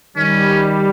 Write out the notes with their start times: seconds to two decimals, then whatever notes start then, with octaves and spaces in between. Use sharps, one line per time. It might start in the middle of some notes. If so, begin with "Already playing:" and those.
0.16 D#3 G3 C#4